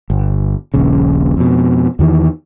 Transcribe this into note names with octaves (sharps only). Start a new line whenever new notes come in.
G1
D#1 A#1 C#3
F2 B2
E2 D#3 E3